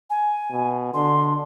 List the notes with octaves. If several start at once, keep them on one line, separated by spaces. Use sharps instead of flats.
G#5
B2
D3 C6